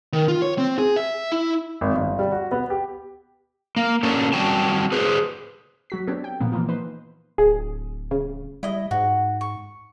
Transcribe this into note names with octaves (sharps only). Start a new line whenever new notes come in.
D#3
F4
C#5
C4
G#4
E5
E4
G#1
G1
G3
F#4
B3
G4
A#3
A#3 C#4 D4 F#4 A4
F#3 G3 C4 F#4 G5 A5
G#4 B4 C5
F#3 F#4 B6
B3 C4 D4 G4 A4 C#5
G5
A#2 F3 A#3 B3
E3 F3 A#3 B3 D#4 F4
D#4 B4 C5
D1 G#4
C#3
G3 E4 D#5
G#2 F#4
C#6